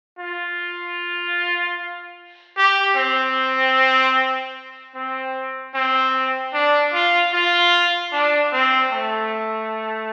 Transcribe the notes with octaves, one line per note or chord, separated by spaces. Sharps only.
F4
G4
C4
C4
C4
D4
F4
F4
D4
C4
A3